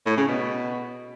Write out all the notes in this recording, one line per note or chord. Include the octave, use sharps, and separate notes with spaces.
A2
C#3
B2